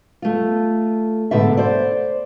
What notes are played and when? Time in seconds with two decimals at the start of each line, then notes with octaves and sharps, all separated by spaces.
0.22 A3 F4
1.31 G#2 B2 D3 A4 E5
1.57 C5 D5